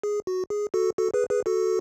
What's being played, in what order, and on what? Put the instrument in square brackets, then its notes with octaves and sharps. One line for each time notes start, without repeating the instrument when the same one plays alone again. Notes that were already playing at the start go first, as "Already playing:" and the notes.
[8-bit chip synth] G#4
F#4
G#4
F#4 A4
F#4 A4
G#4 B4
G#4 B4
F#4 A4